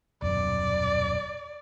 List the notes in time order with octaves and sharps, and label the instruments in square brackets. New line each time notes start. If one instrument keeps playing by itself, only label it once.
[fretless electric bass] D#1 F#2 B2 [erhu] D5